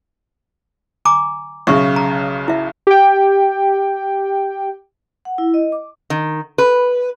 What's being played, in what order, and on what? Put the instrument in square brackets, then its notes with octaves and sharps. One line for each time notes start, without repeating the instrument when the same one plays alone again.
[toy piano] G#5 A#5 D6
[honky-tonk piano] B1 C#3 [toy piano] E5 C#6
[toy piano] A#5
E4 E5
[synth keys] G4 G5
[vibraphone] F#5
E4
D#5
D6
[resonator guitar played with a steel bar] D#3
B4